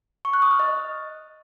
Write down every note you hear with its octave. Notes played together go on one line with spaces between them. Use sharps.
C#6
F#6
D#6
F6
D#5